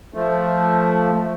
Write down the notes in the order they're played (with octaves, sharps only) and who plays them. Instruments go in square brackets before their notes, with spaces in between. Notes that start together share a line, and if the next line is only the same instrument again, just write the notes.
[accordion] F3 A3